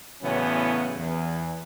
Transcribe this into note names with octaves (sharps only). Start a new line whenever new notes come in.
E2 A2 C#3 F#3 B3 C#4
E2